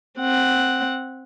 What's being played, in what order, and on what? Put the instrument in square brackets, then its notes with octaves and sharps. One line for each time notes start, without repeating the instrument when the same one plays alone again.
[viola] C4 F#5